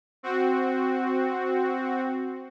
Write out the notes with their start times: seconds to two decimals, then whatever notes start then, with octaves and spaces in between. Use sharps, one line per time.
0.23 C4 F#4